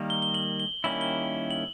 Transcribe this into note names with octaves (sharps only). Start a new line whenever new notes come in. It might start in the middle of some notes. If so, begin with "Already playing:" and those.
Already playing: D#3 G3 A#3
G7
G7
F#7
G7
D#3 G3 A#3 C#4 E4 F#7
G7
F#7